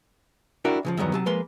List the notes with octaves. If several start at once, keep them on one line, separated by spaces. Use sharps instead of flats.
D4 E4 F#4 A#4 G5
C#3 E3 F3
E2 G2 D#3 F#3 B3
C3 F#3 A5
F3 G#3 A#3 B4 C6